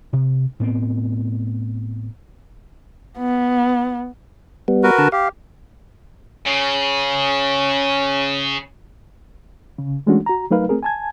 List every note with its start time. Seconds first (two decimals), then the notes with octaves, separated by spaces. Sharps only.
0.13 C3
0.60 A2 B3 C4
3.18 B3
4.68 G3 B3
4.83 F#4 A#4 B4
4.99 D3 A5
5.12 G4 F5
6.47 C#3 C#4
9.78 C#3
10.06 E3 G#3 A3 C#4 D4 F#4
10.26 F#4 A#5
10.51 F#3 A3 D#4 A#4 B4 F5
10.69 A3 C4 G#4 A#4
10.83 G#5 A5 G#6